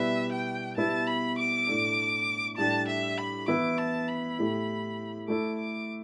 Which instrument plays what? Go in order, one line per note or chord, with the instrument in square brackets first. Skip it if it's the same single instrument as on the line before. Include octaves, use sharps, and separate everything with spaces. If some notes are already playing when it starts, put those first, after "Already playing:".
Already playing: [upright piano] B2 G3 E4 B4 [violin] E5
[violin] G5
[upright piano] B2 G3 B3 E4 B4 [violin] A5
[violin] B5
D6
[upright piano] A2 A3 D4
[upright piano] A2 G3 D4 G4 [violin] A5
[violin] E5
B5
[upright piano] E3 B3 E4 B4 [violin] D6
[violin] A5
B5
[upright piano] A2 A3 E4 G4
[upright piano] A3 E4 A4 [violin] D6
[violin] D6